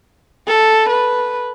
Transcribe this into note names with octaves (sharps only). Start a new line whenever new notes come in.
A4
B4